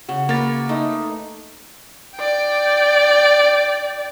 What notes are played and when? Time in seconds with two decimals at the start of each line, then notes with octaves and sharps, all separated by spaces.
0.09 C#3 F#4
0.29 A#3 B4 C#5 A6
0.69 A3 D#4
2.16 D5 G5